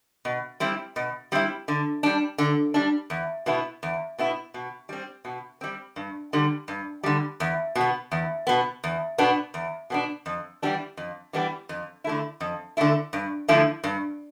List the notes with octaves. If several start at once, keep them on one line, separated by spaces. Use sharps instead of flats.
B2
G3 C4 E4
B2
G3 C4 E4
D3
G3 D4
D3
G3 D4
E2
B2 B3 E4
E2
B2 B3 E4
B2
G3 C4
B2
G3 C4
G2
D3 G3
G2
D3 G3
E2
B2
B3
E2
B2 B3
E2
B2 B3 D4
E2
B2 B3 D4
F2
E3 G3 B3 D4
F2
E3 G3 B3 D4
F2
D3 A3 E4
F2
D3 A3 E4
G2
D3 F3 A3 E4
G2